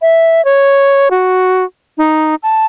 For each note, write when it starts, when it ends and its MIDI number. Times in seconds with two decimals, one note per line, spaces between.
0.02 0.44 76
0.45 1.09 73
1.11 1.64 66
1.98 2.35 63
2.43 2.66 81